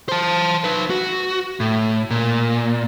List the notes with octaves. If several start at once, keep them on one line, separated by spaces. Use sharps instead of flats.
C5 A5
D#4 B4
F#4
A2
A#2